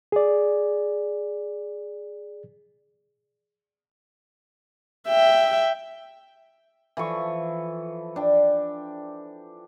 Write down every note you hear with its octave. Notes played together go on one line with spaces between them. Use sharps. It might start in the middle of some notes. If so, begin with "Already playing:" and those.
G#4 D5
E5 G5
E3 F3 A4 C#6
D4 G5